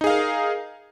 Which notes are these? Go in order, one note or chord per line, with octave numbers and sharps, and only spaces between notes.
D#4 G#4 A#4 F5